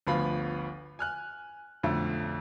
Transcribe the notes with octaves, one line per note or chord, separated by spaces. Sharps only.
G1 D2 F3 B3 F5 B5
G#5 F6 F#6
B1 F2 D3 A3